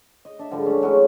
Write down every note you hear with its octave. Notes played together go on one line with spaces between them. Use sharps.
D#5
D4 E5
G#2 D3 F3 G3
A3 C#4
E3 F#3 G#3 C#4